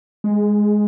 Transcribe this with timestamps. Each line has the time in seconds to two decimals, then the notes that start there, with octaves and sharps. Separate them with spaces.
0.24 G#3